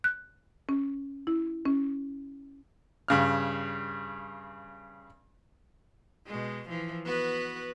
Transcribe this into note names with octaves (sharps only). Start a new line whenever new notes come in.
F#6
C#4
E4
C#4
G2 C#3 F6
B2 G#3
E3 F3
B3 F#4 B4